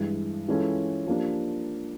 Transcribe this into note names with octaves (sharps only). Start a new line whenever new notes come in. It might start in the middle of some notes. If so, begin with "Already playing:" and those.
Already playing: G2 E3 G#3
E3 G#3 C#4 F4 A4
F3 A#3 D4 G4